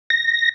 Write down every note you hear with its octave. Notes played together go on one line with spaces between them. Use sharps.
A#6